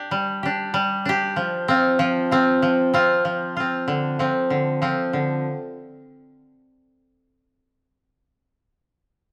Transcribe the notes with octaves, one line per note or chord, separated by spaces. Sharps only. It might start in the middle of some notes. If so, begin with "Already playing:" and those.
Already playing: D4 G4
G3
D4 G4
G3
D4 G4
F3
C4 F4
F3
C4 F4
F3
C4 F4
F3
C4 F4
D3
F3 C4
D3
F3 C4
D3